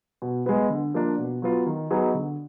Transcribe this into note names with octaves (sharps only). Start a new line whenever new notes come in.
B2
G#3 B3
D3
F3 A#3 D4
B2
F#3 B3 F4
D#3
F#3 B3 D#4 G#4
D3